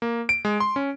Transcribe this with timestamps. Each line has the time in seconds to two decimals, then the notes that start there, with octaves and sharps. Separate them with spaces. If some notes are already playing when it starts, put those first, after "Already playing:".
0.02 A#3
0.29 D7
0.45 G#3
0.60 C6
0.76 C#4